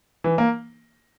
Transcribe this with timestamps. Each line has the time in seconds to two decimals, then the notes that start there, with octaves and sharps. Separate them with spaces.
0.24 E3
0.38 A#3